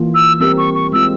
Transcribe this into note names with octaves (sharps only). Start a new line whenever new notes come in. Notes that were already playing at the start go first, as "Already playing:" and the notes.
Already playing: E3 A#3 F4
E6
G3 C4 G4 A#4 E6
C#6
C#6
G#3 C4 F4 E6